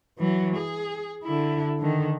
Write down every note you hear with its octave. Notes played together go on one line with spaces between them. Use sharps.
E3 F#3
G#4
D3 E4
D3 D#3